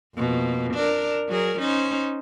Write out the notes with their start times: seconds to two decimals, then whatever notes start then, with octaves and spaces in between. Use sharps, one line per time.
0.15 F2 B2 A#3
0.74 D4 A#4
1.29 F#3 G#4 A#4
1.58 C#4 D#4 C5